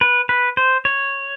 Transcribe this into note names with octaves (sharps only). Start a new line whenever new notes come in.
B4
B4
C5
C#5